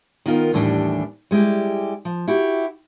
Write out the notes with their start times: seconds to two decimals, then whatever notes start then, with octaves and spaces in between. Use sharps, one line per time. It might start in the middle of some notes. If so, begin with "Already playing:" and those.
0.26 D#3 B3 F4 A#4
0.53 D#2 A2 E3 G3 B3 D4
1.31 G3 G#3 E4 G4
2.05 F3
2.28 E4 F#4 G4